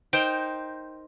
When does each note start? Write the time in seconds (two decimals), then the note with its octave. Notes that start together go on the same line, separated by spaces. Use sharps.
0.13 D#4 A#4 C5 G5